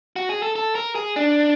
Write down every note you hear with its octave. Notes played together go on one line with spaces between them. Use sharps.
F#4
G#4
A4
A4
A#4
G#4
D4